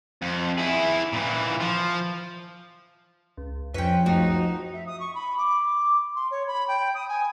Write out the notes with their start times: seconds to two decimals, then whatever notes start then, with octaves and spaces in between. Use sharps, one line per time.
0.22 F2
0.58 E4 G#4
1.13 A#2 E3
1.60 F3
3.37 C#2
3.74 F2 F3 C4 C#4 B4 G5
4.06 C#2 F#2 A3 D#4 F#4
4.73 E5
4.86 D#6
5.00 C#6
5.14 B5
5.37 D6
5.66 D6
6.15 C6
6.31 C#5
6.47 B5
6.67 G5
6.94 D#6
7.09 G#5